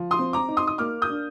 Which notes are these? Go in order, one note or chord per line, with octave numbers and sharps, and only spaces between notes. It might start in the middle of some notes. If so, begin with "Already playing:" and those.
Already playing: F3
C6 D#6
C4
A#5 D6
D#4
C6 D#6
D#6
A#3 D6 F6
D#6 G6
D4